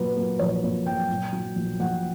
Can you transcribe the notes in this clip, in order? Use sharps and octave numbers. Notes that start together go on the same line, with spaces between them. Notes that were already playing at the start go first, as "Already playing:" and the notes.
Already playing: A#2 F#3 B4
A#3
A#1 C#5
A#2
F#3 G5
A#2
F#3
A#1
A#1 F#5